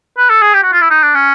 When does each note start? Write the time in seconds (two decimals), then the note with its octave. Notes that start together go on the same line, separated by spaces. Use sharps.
0.18 B4
0.30 A4
0.42 G#4
0.54 G4
0.63 F#4
0.72 F4
0.81 E4
0.90 D#4
1.03 D4
1.15 C#4